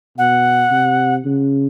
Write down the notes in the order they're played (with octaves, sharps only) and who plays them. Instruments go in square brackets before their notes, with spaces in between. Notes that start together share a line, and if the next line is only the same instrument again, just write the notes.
[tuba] B2 [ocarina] F#5
[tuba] C3
C#3